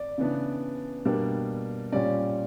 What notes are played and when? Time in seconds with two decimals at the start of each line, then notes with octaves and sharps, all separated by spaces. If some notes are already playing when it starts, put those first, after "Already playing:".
Already playing: D5
0.18 C#3 E3 B3 D4
1.05 B2 G3 A#3 D4
1.92 A#2 G3 C#4 D5